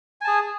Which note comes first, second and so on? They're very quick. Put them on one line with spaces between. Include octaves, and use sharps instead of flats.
G#5 A5 G#4